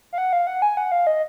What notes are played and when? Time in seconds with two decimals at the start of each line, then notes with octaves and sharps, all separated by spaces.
0.13 F5
0.18 F#5
0.33 F5
0.47 F#5
0.62 G#5
0.77 F#5
0.92 F5
1.07 D#5